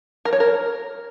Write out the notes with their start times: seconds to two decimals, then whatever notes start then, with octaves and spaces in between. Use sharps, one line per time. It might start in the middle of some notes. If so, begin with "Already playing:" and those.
0.25 A#4
0.33 C#5
0.40 A#4